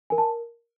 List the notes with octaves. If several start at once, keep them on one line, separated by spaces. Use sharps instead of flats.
A#4 G#5
A5